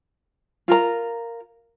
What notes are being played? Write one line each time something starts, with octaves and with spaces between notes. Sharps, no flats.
F4 A#4 A#5